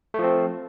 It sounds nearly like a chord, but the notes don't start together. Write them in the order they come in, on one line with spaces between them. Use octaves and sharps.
A3 F3 C4